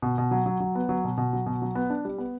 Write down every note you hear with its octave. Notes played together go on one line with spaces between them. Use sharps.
B2
B2
F#3
F#3
F#3
B3
F#3
B2
B2
F#3
B2
F#3
B3
D4
G3
B3